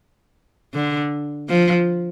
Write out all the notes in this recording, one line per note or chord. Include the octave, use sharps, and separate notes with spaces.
D3
F3